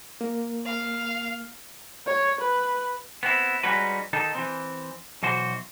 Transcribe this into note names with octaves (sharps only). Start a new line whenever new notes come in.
A#3
F5
C#5
B4
B3 C4 E4
G3 G#3 C#4 D#4 F#4 B4
D#3 D#4 A4
E3 C4
B1 E3 F#4 C5